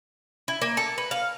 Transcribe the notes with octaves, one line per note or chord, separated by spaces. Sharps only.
E4
A#3
A4
B4
F5